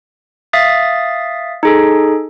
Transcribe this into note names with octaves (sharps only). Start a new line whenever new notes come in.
E5 F5 D#6 A6
D#4 G#4 A4